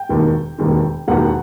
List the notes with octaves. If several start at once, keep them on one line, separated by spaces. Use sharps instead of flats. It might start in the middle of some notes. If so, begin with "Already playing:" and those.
Already playing: G5
E1 D#2 D#3
E1 D#2 D#3
E1 D#2 D#3 F#5